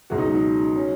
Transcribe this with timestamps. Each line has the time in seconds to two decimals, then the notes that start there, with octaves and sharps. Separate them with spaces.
0.10 C#2 B2 F#3 F#4
0.18 D#4
0.35 D#4
0.76 F#3 C#4